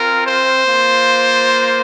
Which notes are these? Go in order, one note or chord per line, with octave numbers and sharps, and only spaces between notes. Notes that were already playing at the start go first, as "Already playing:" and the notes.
Already playing: C4 F4 A#4
C5
A#3 F4